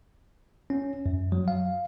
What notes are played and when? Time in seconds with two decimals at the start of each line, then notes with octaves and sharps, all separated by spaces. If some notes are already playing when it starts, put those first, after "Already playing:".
0.70 C#4
1.06 F#2
1.32 F#3
1.48 F5